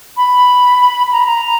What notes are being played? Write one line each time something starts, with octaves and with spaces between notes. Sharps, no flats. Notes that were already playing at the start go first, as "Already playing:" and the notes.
B5
A#5
B5
A#5